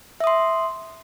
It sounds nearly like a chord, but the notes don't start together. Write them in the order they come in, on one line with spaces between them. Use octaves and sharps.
E5 D#6 C6